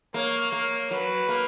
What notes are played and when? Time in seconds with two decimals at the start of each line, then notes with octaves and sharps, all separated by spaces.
0.13 A#3 C#5
0.52 A#3
0.91 F#3 B4
1.29 A#3